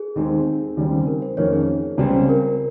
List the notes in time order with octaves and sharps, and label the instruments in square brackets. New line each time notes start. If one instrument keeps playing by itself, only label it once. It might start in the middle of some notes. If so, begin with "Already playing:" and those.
Already playing: [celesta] G#4
[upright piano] D#2 D#3 G#3 C4
D#2 C#3 G3 C4
[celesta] A#4
C5
[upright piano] F2 D#3 A#3 C#4 F4 [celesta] C#5
[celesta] G#4
[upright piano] C#2 C#3 G3 C4
[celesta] A#4